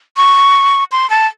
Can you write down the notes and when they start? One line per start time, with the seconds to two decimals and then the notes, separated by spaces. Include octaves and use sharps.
0.17 C#6
0.92 C6
1.10 A5